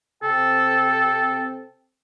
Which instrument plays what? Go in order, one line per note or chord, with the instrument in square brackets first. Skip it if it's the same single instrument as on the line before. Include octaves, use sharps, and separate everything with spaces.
[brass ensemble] C3 C4 G5 [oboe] A4